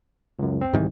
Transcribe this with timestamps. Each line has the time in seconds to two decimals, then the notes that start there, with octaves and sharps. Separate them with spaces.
0.39 C#2 F#2
0.61 C4
0.73 C2 G#2 C3 D#3 E3